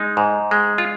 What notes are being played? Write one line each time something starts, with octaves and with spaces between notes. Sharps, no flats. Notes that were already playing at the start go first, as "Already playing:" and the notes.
Already playing: G#3 D#4
G#2
G#3
F4